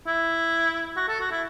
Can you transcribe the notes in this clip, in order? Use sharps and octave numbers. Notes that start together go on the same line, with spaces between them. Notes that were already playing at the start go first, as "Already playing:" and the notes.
E4
F#4
A4
F#4
E4